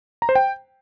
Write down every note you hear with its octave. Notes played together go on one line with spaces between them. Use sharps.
A#5
C5
G5